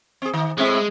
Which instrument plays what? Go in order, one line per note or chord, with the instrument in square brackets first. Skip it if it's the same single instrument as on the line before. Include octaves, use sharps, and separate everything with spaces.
[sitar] C4 G#4
D#3
[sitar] A2 C4 E5 [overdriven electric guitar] G#3